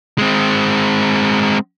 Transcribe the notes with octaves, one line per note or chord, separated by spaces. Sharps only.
G#3 C4